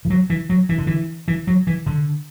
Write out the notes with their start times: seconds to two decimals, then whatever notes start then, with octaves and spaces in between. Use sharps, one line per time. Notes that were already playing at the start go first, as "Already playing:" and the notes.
0.05 E3
0.10 F#3
0.30 E3
0.50 F#3
0.69 E3
0.78 D3
0.87 E3
1.28 E3
1.47 F#3
1.67 E3
1.86 D3